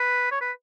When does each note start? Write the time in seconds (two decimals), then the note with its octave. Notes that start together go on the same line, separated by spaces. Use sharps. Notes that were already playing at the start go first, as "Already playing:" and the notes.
Already playing: B4
0.31 C#5
0.41 B4